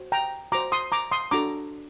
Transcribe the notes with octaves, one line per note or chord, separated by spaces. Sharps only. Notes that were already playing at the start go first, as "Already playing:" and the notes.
Already playing: F#4 C5
G5 A#5
F#4 C5 A#5 D6
C6 D#6
A#5 D6
C6 D#6
D4 F#4 A4 A#5 D6